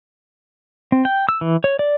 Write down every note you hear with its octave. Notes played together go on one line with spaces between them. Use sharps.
C4
G5
E6
E3
C#5
D5